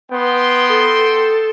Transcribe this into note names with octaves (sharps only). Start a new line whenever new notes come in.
B3 D#5 G5 C6
A4